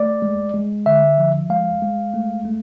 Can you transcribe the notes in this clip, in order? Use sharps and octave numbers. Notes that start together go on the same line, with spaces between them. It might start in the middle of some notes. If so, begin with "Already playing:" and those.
Already playing: A3 D5
G#3
G#3
D3 E5
F3
G#3 F5
G#3
A3
A3